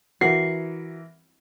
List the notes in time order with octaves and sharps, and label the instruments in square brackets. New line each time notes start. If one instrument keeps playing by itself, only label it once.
[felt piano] E3 A#4 [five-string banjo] F#4 [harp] C7